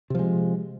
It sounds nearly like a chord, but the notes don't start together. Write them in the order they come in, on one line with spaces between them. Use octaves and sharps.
C3 F3 G#3